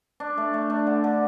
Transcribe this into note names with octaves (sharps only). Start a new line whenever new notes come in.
D4
A3
A3
D4
D3
D3